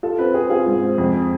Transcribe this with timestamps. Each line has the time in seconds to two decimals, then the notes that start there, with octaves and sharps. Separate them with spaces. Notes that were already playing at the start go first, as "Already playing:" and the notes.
0.03 F4 A4
0.18 C4 B4
0.34 C4 G#4
0.50 F4 G#4
0.67 G#2
0.83 C4
0.98 F2